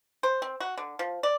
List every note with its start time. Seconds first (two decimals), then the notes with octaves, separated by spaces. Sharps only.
0.23 C5
0.42 C4
0.60 F#4
0.78 D3
0.99 F3
1.23 D5